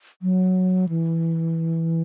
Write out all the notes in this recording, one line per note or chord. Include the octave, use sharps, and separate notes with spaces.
F#3
E3